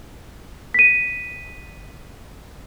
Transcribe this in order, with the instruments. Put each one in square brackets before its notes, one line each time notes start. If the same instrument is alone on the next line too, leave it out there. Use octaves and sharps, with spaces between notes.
[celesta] B6 D#7